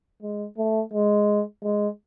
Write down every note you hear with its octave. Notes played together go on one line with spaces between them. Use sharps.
G#3
A3
G#3
G#3